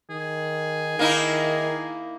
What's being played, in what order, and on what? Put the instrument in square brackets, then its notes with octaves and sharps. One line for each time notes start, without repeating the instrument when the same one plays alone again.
[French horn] D#3 [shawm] G#4
[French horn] D#3 [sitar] A#3 D#4 E4